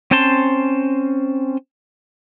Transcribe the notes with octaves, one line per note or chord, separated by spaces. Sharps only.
C4 C#4 C5 A5 C6